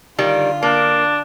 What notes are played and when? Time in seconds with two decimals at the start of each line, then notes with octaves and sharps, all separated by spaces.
0.18 D3 D#3 G3 F4
0.63 A#3 D4